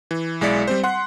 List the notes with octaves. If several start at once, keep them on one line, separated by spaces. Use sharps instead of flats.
E3
B1 G#3 E4 D5 B6 C#7
G3 C4 C5
F#5 C6 F#6